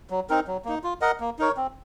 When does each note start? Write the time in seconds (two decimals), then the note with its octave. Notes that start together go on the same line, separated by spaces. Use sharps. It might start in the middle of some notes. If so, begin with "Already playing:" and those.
0.10 F#3
0.30 C4 D#4 A#4
0.47 F#3
0.65 A#3 D#4
0.84 F4
1.01 A#4 D#5 F#5
1.20 A#3
1.39 D#4 A#4 C#5
1.57 C4